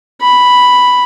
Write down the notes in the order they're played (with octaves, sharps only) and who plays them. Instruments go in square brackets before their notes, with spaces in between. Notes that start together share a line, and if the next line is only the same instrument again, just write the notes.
[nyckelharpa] B5